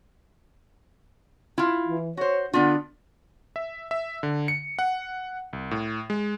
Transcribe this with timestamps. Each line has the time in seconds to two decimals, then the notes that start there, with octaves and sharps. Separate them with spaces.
1.58 E4 F4
1.86 E3
2.17 F#4 C5 C#5
2.54 D3 B3 D4 F4
3.56 E5
3.91 E5
4.23 D3
4.48 C#7
4.79 F#5
5.53 C2
5.71 A2
6.10 G#3